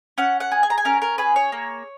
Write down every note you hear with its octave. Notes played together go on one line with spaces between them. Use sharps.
C#4 F#5
F#5
G#4
G#5
A#5
G#5
C#4 A#4
A#4
G#4 B4
C#5
A#3